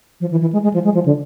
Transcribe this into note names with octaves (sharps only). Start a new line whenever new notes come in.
F3
E3
E3
G#3
G#3
F3
G#3
F3
D3